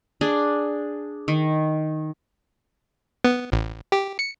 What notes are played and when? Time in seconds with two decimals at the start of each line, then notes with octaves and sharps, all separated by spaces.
0.21 D4 G#4
1.28 D#3
3.24 B3
3.52 A1
3.92 G4
4.19 C#7